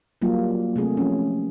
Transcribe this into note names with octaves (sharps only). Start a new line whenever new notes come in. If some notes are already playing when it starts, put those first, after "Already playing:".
F#3 G3 A#3 F4
C3 A3 G#4
F3 C#4